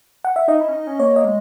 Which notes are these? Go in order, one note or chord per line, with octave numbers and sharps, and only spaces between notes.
F#5
E5
D#4 D#5
E4
C#4
D#4
C#4
A#3 C#5
D#5
G#3